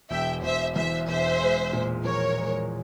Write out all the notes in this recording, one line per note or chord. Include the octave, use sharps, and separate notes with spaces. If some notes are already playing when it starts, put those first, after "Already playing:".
E1 E5 G5
E1 C5 E5
E2 C5 E5
E1 C5 E5
G#3
A#2
F3 A#4 C#5
G#3